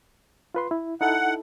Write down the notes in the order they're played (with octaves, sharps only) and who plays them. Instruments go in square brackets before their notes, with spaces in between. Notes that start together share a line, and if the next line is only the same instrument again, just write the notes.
[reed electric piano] F4 B4 C6
E4
[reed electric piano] D#4 E4 A4 [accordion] F#5